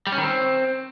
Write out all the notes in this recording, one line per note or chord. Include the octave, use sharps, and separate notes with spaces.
G3
C#4
D#3
C4